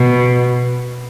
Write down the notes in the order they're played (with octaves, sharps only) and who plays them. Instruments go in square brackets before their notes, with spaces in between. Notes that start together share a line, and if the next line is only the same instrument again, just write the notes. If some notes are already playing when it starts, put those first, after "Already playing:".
Already playing: [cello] B2